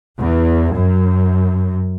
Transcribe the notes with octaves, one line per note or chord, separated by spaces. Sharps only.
E2
F#2